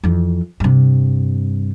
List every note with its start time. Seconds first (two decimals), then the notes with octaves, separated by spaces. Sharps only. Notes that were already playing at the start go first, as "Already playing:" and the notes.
0.04 F2 E3
0.60 G2 C3